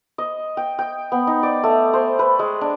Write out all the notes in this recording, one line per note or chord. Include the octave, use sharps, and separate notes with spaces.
D#5
G5
G5
B3
D#4
D5
A3
C5
B4
G#3
D4